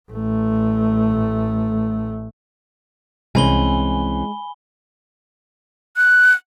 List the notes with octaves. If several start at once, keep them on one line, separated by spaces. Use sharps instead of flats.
A1 A3
C2 E3 G#3 C4 C#4 G#5 B5 G7
F#6